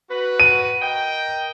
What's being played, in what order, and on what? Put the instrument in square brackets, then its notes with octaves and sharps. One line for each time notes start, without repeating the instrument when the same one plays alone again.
[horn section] F#4 B4
[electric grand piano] D#7
[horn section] A#4 D#5 G5